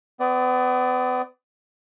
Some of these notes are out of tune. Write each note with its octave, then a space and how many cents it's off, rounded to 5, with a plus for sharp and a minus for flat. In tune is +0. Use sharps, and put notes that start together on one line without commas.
B3 +40 D5 +0 D#6 +0